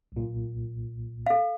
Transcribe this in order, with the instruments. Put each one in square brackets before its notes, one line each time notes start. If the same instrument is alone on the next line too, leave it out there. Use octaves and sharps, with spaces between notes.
[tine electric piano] B1 A#2
[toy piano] A4 F5